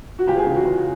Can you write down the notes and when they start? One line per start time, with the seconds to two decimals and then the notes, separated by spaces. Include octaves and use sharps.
0.19 F#4
0.27 C#2 G4
0.37 G#4
0.46 C#3 E3
0.56 F#4
0.65 C#2